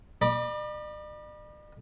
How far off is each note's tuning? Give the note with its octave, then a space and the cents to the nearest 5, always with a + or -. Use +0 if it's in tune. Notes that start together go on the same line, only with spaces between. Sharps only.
D5 +45 B5 -30 D6 +0